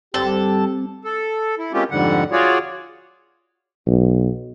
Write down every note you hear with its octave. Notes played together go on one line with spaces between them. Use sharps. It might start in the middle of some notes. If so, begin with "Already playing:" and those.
G2 D3 G3 C4 G4 A4
A4
E4
G#3 A#3 C4 C#4 F4 G4
F2 G#2 D3 G3 F#5
F4 F#4 G#4 C#5 D5
B1